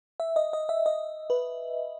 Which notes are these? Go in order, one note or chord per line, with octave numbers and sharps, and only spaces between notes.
E5
D#5
D#5
E5
D#5
B4